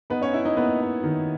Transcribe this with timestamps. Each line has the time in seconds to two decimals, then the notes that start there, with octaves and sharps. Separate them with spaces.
0.10 B3 D#4 B4
0.21 C#4 C#5
0.33 D#4 E4 E5
0.45 D#4 D#5
0.57 A#3 B3 B4
0.80 D#4
1.04 D#3